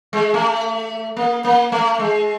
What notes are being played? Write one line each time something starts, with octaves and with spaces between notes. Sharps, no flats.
G#3
A3
A#3
A#3
A3
G#3